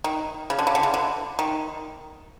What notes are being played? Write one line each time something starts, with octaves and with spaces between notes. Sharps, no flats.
D#3
C#3
D3
C#3
D3
C#3
D3
D#3